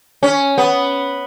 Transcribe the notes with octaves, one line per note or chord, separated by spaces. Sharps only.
C#4
B3